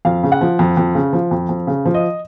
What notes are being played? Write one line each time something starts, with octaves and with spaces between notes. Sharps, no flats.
F2 F5
C#3
F#5
F3
F2
F2
C#3
F3
F2
F2
C#3
F3
D#5